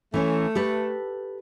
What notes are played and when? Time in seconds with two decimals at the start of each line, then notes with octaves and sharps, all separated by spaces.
0.14 E3 A3 C#4
0.55 G4 A4 B4